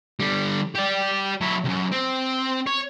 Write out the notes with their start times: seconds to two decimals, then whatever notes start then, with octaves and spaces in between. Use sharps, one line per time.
0.20 D3 G3
0.75 G4 D5
1.41 F#3 E4
1.65 C#2 F#2
1.92 C4
2.67 C#5